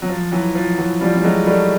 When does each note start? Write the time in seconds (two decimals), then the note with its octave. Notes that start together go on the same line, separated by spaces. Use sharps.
0.02 F#3
0.09 F3
0.32 E3 F#3
0.55 F3
0.77 E3 F#3
1.01 F3 G3
1.16 G3
1.23 F#3 G#3
1.47 G3 A3